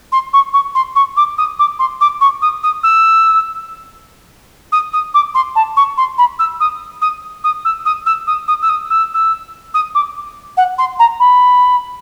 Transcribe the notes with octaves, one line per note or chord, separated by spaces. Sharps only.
C6
C#6
C#6
C6
C#6
D6
D#6
D6
C6
D6
C#6
D#6
D#6
E6
D#6
D#6
D6
C6
A5
C#6
C6
B5
E6
D#6
D#6
D#6
E6
D#6
E6
D#6
D#6
E6
D#6
E6
E6
D#6
D6
F#5
C6
A#5
B5